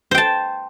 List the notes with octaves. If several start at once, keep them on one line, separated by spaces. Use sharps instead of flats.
C5 G5 A5